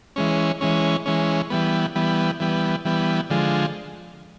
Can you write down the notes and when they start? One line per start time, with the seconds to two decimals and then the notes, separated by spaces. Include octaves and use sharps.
0.16 E3 G#3 C#4
0.61 E3 G#3 C#4
1.06 E3 G#3 C#4
1.50 E3 G3 B3
1.95 E3 G3 B3
2.40 E3 G3 B3
2.85 E3 G3 B3
3.30 D3 F3 G#3